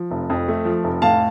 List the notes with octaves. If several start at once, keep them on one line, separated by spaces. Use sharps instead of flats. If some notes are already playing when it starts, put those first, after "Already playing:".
Already playing: F3
F1
F2
A3
F3
F1
A2 F5 A5